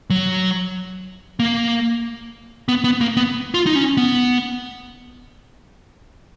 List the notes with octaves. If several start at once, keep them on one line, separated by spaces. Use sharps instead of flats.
F#3
A#3
B3
B3
A#3
B3
F4
D#4
C#4
B3